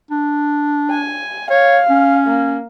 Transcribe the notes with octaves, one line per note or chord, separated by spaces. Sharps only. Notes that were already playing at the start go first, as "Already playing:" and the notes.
D4
G#5
C#5 F5
C#4
A#3